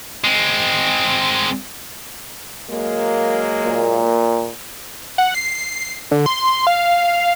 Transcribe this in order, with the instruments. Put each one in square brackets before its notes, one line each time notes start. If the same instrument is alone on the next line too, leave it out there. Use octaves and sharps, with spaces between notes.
[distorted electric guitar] G#3 C4
[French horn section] F#3 G#3 A#3
[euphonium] A#2
[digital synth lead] F#5
C7
D3
C6
F5